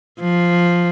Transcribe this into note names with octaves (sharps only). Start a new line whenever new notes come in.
F3